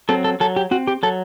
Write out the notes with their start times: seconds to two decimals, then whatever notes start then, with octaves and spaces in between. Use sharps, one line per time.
0.09 F#3 C4 A4
0.24 A4
0.40 F#3 A4
0.56 G4
0.71 C4 F#4
0.87 G4
1.03 F#3 A4